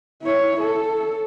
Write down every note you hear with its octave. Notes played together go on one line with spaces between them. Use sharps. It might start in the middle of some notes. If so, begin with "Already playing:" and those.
E4 C#5
A4